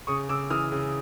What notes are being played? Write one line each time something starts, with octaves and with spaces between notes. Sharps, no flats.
C#3 C#6 D#6
C#3 D6 E6
E3 D#6 F6
C#3